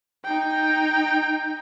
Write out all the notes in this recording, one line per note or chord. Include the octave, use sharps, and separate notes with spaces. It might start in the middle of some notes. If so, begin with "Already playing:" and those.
D#4 G5